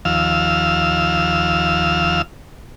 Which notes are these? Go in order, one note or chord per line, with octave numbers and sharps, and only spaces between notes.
D#2 F3 F5 E6